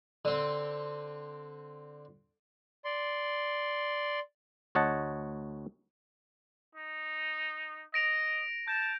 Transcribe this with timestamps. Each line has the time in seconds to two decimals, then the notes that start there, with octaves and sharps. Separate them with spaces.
0.25 D3 C4
2.85 D5 C6
4.75 D2 C#5 D#5 F#5 A5
6.75 D#4
7.94 D#5 A#6 D7 F7
8.68 A5 G6